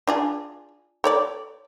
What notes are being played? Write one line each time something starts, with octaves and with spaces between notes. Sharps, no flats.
D4 F4 G#4
A4 C#5 D5